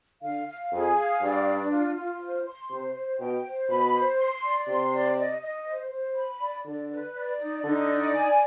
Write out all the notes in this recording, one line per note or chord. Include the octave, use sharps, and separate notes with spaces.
D3 F5
F5
F2 G#4
F5
G2 D5
D4
F4
F4
C5
C6
C3 C5
C5
B2 G5
C5
B2 B5
C5
C6
D5
C3 C6
D5
D#5
D#5
C5
C5
B5
D5
D3 D5
B4
D5
D#4
D3 D#4
D5
G#5